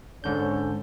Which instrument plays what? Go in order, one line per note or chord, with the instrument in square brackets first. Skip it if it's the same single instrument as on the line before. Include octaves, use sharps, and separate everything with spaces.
[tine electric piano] G#2 D3 G6 [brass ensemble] C#4 A4 C#5